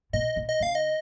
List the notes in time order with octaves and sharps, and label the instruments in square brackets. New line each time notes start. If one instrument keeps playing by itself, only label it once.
[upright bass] B2 [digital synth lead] D#5
[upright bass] B2
[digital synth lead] D#5
[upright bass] C#3 [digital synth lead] F5
[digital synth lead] D#5